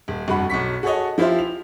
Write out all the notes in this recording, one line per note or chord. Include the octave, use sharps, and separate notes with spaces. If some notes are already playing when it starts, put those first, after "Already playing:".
D#1
F1 G2 F#4 F#5 B5
B1 F#3 C#6 B6
F#4 G#4 A4 C#5 D#5
F3 E4 F4 G4 C5 E5
F7